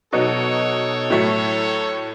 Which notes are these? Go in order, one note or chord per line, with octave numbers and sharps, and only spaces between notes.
B2 F#3 B3 D#4 F#4 A4 C#5
A2 F#3 A3